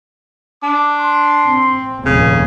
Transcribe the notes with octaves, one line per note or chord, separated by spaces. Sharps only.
D4 D6
C6
C4
F1 D#2 A#2 C#3 G#5